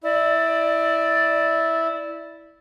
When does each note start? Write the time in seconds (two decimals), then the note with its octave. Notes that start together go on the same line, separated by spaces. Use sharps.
0.04 E4 D5